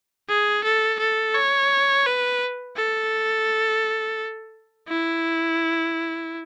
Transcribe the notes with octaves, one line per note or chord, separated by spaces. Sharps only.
G#4
A4
A4
C#5
B4
A4
E4